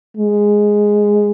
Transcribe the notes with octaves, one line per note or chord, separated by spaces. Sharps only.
G#3